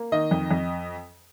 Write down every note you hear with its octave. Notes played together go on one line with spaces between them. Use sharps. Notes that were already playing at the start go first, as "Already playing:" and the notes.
Already playing: A#3
D#3 D#5
F2
F2